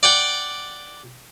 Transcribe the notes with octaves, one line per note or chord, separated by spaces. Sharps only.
D5 F#5 G5